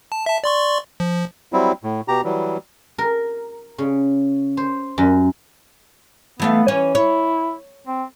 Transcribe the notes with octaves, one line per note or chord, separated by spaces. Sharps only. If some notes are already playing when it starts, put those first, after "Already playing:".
A5
E5 A5
D5 C6 C#6
F3
F#3 G3 C4 E4
A2
B2 G4 A#5
E3 F#3 G3
A#4
C#3
C5
F#2
E3 A3 B3 F5
E3 C#4
E4 C#5
C4